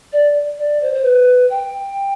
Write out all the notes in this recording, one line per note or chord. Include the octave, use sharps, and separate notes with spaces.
D5
D5
C5
C5
B4
G5